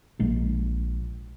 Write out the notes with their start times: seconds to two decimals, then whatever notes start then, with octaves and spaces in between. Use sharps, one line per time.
0.19 A#1 G#3 A#3